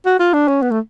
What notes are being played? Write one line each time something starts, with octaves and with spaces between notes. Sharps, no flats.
F#4
F4
D4
C#4
B3
A3